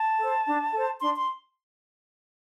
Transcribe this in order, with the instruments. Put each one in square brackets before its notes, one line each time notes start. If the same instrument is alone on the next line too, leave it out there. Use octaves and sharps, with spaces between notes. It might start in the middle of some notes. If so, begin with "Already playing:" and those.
Already playing: [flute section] A5
A4 C5
D4
A4 C5
D4 C6
C6